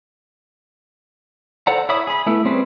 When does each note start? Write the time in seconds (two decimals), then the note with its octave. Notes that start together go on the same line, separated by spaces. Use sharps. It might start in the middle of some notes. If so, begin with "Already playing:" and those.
1.67 A4 C5 D5 F#5 A#5
1.89 E4 C#5 E5 B5 D#6
2.07 G#4 B5
2.26 A3 B3 E4
2.45 G3 C4 C#4 G#4 B4